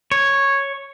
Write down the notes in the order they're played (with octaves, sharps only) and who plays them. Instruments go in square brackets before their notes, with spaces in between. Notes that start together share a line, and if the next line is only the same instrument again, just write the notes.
[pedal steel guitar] C#5